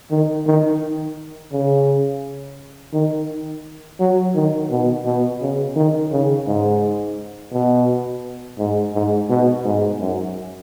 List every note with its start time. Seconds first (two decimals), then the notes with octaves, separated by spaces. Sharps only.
0.11 D#3
0.46 D#3
1.52 C#3
2.93 D#3
4.00 F#3
4.35 D#3
4.70 B2
5.06 B2
5.41 C#3
5.76 D#3
6.12 C#3
6.47 G#2
7.53 B2
8.59 G#2
8.94 G#2
9.29 B2
9.64 G#2
10.00 F#2